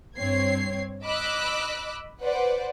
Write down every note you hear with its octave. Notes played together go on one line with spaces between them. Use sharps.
G2 C4 C#5 G#6 C7
D#5 B5 D6 E6 F#6
B4 C5 D5 F#5